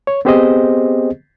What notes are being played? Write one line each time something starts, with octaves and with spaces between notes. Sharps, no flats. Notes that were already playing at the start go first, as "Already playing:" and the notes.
C#5
B3 C4 G4 G#4 C5 D#5